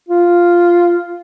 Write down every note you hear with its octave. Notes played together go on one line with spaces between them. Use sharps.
F4